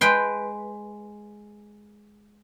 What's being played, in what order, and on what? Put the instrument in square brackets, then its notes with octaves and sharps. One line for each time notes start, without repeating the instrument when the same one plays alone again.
[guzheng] G#3 B4 G5 C6